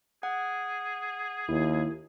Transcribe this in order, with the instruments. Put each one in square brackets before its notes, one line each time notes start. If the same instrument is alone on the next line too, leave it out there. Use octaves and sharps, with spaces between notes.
[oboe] G#4 [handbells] F#5
[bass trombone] D#2 [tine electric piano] E4